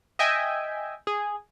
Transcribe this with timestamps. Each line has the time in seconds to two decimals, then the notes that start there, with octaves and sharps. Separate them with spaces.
0.19 D#5 E5 G5 G#5
1.07 G#4